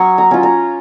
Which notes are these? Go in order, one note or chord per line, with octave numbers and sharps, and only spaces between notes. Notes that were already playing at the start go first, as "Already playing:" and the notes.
Already playing: F#3 C#4 C#6 D#6
A#5
C#4 F4
A#5